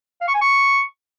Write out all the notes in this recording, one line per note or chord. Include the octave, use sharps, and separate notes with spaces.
F5
C#6
G#5
C#6